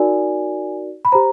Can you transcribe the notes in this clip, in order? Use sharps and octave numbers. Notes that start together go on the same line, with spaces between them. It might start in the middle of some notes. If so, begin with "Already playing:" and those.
Already playing: D#4 F#4 A#4 D5 G#5
B5
G4 C5 A#5